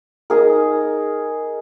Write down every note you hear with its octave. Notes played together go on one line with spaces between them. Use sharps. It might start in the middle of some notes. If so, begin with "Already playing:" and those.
D#4 G#4 A#4